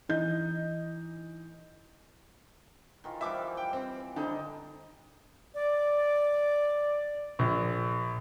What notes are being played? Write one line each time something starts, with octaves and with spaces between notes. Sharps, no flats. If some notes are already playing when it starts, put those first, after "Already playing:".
E3 D#4 D#5 G6
D#3 E3 F4
E3 F3 G3 E5 D6
G5
C4
D3 G3 D#4
D5
A#1